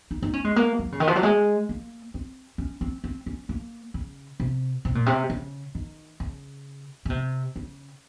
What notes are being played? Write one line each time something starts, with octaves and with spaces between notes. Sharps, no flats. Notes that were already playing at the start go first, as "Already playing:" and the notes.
D#4
D#4
C#4
G#3
A#3
F#3
C#3
D#3
F3
F#3
G#3
A#3
C4
C#4
C4
C4
C#4
A#3
C#3
C3
C3
A#2
C3
C#3
D#3
C#3
C#3
C3
C#3